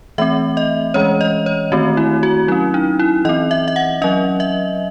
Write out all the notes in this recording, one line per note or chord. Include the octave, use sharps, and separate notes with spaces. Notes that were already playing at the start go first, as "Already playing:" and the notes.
E3 A3 C4 E5
D#5
E3 G#3 C#4 C#5
D#5
C#5
D#3 A3 C4 F#4
E4
F#4
F#3 C#4 E4
D#4
E4
E3 C4 D#5
E5
E5
F#5
F#3 C#4 D#5
E5